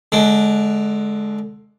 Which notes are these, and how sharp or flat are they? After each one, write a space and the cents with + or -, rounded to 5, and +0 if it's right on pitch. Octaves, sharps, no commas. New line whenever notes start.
D3 +0 G#3 +25